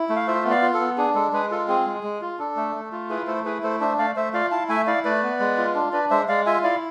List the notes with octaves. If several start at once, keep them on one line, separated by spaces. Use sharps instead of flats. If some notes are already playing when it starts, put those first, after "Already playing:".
Already playing: E4
A3
F5
F4 C5 E5
B3
D5 F5
F4
A4
B3
D4 G#4
G#3 A4
G#3 G#4 B4
F4 A4
C4 G#4
G#3
G#3
F4
D4 A4
A3
A3
F4
E4 G#4 B4
A3 A4 C5
E4 G#4 B4
A3 A4 C5
D4 C5 E5
A3 D5 F5
A3 C5 E5
F4 D5 F5
E4 F5 A5
A3 E5 G#5
E4 D5 F5
A3 B4 D5
B3
G#3
F4
D4
D4 B4 D5
G#3 C5 E5
G#3 D5 F5
F4 E5 G#5
E4 D5 F5